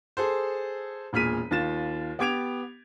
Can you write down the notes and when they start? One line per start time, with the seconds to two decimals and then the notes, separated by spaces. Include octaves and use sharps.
0.17 G#4 A4 C5
1.13 E1 A#2 G#4 F6 B6 D#7
1.51 D#2 F4 A6 E7
2.19 B3 G4 D6 G#6 D7 F7